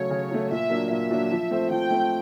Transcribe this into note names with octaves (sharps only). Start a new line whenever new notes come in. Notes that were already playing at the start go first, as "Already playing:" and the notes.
Already playing: C#3 F#3 A3 C#5
C#3
F#3 A3
A#2 E5
F#3 A#3 D4
A#2 E5
F#3 A#3 D4
F3
A3 C4
F3 G5
A3 C4